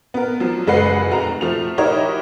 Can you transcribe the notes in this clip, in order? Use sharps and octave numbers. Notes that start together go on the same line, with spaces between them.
B3 A#4
F3 F#3
F#1 G#3 B4 F#5 C7
F1 F#4 A#5
F3 A3 F7
D#4 E4 F#4 G4 A#4 C#5